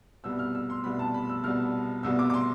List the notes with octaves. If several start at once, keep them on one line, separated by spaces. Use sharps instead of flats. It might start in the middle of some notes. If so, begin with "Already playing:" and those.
C2 B2 G3 B3 E6
F6
E6
C6
C2 B2 G3 B3 B5
A5
B5
E6
C2 B2 G3 B3 F6
C2 B2 G3 B3 E6
D6
D6
C6